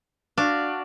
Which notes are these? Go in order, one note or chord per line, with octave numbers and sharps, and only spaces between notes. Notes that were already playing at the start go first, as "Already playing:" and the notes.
D4 F#4 F5